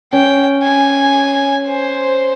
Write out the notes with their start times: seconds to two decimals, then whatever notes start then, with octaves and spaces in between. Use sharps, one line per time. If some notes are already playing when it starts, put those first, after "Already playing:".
0.13 C#4 G5
0.63 G#5
1.67 C5